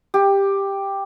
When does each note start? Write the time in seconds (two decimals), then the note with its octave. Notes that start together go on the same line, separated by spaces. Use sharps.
0.14 G4